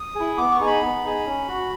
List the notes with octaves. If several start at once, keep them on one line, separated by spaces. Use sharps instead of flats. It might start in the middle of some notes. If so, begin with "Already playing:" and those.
Already playing: D#6
E4 G#4
B3 D6
C#6
D#4 G#4
B5
B3
D#4 G#4
C#4
F#4